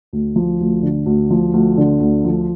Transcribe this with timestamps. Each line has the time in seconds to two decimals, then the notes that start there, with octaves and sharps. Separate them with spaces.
0.13 D2
0.36 F3
0.60 D2
0.82 D3
1.06 D2
1.31 F3
1.53 D2
1.77 D3
2.00 D2
2.24 F3